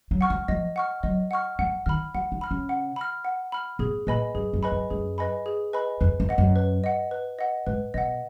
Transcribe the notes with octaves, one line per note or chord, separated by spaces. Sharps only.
F#3
F#5 C#6 F6
F3
F3 D#5
F#5 C#6 F6
F#3 D#5
F#5 C#6 F6
F3 F#5
D#3 B5 F6
F3 F#5
D#3
B5 F6
C#3
F#5
B5 F6
F#5
B5 F6
B2 G#4
A#2 B4 D#5 G#5 B5
F#2 G#4
F#2
B4 D#5 G#5 B5
F#2
F#2 G#4
B4 D#5 G#5 B5
G#4
B4 D#5 G#5 B5
F2 B4
F2
D#5 F#5
F#2
B4
D#5 F#5
B4
D#5 F#5
G#2 B4
B2 D#5 F#5